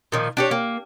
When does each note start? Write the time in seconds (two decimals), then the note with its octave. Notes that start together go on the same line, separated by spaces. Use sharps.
0.12 A#2 D#3 F3
0.37 D4 G4 C#5
0.51 A#3